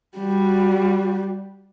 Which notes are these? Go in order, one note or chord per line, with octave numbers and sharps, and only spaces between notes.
G3 F#4